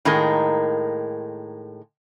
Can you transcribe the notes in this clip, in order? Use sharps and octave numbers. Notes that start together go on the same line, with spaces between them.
A2 D#3 G#3 A#3 D#4 A#4